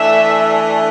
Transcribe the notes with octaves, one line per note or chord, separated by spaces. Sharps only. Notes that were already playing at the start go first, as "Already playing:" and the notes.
Already playing: E3 A3 D4 E5